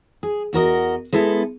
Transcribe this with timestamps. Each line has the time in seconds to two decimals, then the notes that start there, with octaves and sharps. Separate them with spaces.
0.23 G#4
0.53 E2 F#4 A#4 D#5
1.13 G#3 B3 E4 A4